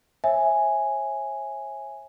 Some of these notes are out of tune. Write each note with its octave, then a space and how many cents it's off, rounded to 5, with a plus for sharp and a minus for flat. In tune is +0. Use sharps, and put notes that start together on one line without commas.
C#5 -40 E5 +0 G#5 +0